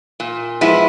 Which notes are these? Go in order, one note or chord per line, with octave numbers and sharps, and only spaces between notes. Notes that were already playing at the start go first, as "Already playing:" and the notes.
A#2
F3 G#3 B3 E4